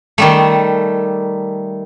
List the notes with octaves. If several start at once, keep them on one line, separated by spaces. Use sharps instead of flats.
D#3 G3 A3